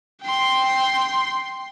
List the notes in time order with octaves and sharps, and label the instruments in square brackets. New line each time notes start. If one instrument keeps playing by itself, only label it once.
[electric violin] G5 C6